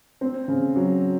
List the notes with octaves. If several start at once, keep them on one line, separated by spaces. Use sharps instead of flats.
C4
C#3
F#3